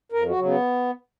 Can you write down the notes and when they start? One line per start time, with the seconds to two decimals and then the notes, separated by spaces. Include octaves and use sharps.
0.12 F2 A#4
0.28 F#4
0.36 C#3 F#3
0.45 B3